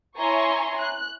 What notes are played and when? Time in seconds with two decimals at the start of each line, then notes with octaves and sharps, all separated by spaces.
0.18 E4 C#5 G#5 A#5 C6 C#6
0.78 F#6